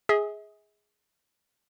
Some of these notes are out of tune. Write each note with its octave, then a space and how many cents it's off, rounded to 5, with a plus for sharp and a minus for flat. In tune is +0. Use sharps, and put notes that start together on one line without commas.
G#4 +0 E5 -45